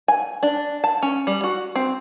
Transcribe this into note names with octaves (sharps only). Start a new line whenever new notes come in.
G#5
D4
A5
C#4
G3
F#4
C4